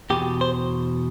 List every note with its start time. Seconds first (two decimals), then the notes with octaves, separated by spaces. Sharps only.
0.10 E2 B2 G4
0.41 C5